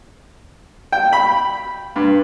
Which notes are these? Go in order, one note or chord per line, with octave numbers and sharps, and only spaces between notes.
G5
B5
G2